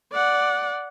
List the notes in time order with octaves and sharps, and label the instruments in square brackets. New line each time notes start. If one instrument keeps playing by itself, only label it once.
[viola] D5 F#5